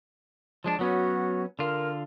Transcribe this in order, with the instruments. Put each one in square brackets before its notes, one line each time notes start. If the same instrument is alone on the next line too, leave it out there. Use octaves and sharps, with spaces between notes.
[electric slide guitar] F3 G#3 D4 [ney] A5
[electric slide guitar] F#3 B3 C#4 [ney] F#4
[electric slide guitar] D3 F4 [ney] A#4